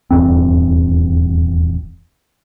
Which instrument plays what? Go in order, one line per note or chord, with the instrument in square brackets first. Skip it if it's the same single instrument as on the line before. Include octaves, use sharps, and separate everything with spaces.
[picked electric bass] D#1 E2 G2 C4